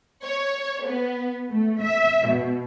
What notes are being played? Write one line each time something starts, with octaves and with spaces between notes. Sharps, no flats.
C#5
B3
A3
E5
B2